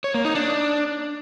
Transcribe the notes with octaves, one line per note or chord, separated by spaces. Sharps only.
C#5
A#3
D#4
D4